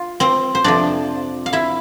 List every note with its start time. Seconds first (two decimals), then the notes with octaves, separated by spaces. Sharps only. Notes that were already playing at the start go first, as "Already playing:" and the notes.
Already playing: F4
0.20 C4 C5
0.55 C5
0.64 F2 C3 F3 D4 D5
1.46 F5
1.53 E4 E5